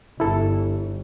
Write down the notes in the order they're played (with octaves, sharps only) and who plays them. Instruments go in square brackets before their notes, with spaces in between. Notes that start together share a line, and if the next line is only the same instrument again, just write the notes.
[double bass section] G1 [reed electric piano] E4 A4